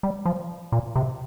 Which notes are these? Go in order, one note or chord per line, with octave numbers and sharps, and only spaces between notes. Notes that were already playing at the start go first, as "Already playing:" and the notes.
G3
F3
A#2
C3